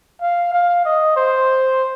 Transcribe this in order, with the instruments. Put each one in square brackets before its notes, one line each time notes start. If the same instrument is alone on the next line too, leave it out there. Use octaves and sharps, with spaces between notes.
[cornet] F5
F5
D#5
C5